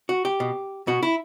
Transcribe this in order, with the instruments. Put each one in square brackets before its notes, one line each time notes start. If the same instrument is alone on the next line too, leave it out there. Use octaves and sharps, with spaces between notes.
[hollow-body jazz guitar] F#4
G4
B2
B2 F#4
E4